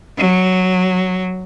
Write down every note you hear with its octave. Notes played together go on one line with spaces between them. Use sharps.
F#3